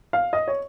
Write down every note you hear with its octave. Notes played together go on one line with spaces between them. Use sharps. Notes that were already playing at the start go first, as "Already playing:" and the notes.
F5
D#5
C#5